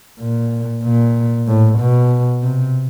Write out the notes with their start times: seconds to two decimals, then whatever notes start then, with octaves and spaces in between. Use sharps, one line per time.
0.20 A#2
0.83 A#2
1.48 A2
1.79 B2
2.43 C3